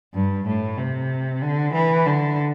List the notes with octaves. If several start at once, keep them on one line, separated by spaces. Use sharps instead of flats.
G2
A2
C3
D3
E3
D3